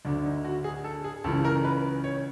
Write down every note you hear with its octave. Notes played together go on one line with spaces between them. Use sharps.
D2 D3 D4
D#4
F#4
G#4
A4
G#4
C#2 C#3 E3 A4
A#4
B4
C#5